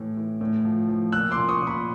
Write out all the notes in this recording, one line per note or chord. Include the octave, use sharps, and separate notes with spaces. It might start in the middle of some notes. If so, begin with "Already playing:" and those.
Already playing: A2 E3
E3
A2
F3
F3
A#2 E6 F#6
C6 D6
A#2
C#6 D#6
A#2
B5 C#6